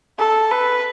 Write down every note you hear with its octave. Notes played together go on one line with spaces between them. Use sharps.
A4
B4